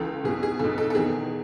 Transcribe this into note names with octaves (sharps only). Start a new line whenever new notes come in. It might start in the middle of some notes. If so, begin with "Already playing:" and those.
Already playing: C#2 C#3 E3 A4
B1 B2 G#4
G#4
B1 B2 A4
A4
A4
E2 D#3 G#4